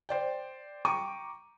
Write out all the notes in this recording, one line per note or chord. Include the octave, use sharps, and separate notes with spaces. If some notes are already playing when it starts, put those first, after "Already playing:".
C5 D5 G5
G5 A#5 C#6 D6 D#7